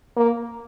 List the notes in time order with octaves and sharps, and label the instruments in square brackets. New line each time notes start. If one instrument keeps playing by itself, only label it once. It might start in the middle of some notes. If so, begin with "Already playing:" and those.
[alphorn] A#3